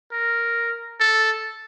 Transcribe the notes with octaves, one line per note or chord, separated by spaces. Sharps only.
A#4
A4